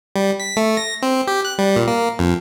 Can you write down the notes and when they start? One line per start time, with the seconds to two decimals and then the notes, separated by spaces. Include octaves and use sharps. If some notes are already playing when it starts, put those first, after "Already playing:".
0.16 G3
0.40 B6
0.57 A3
0.77 A#6
1.02 C4
1.27 G4
1.45 F#6
1.58 G3
1.76 A#2
1.88 A#3
2.19 F2